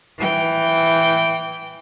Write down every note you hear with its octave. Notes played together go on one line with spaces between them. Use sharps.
E3 G5